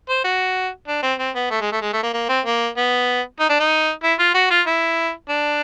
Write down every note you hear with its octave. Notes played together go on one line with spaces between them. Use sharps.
C5
F#4
D4
C4
C4
B3
A3
G#3
A3
G#3
A3
A#3
A#3
C4
A#3
B3
D#4
D4
D#4
E4
F4
F#4
F4
E4
D4